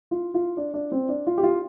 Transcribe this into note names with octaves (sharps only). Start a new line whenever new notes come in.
F4
F4
D4
D4
C4
D4
F4
G4
F4